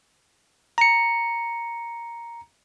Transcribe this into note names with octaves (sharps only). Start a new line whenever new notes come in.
A#5 C#7